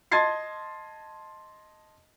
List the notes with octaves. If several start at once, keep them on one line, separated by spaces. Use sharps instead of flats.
D#5 A5 C6 G#6 A6 C7